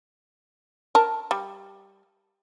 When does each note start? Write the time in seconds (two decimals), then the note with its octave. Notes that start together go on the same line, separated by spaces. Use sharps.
0.95 A#4 A5
1.31 G3